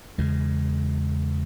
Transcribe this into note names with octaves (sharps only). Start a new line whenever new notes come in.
E2 C#3 G#3